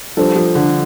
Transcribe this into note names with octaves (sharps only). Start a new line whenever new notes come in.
F3 G3 D4 A4 C5
F3
D3